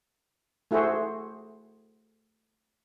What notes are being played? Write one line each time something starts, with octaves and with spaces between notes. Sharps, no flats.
A3 E4 F#4 G#4 C5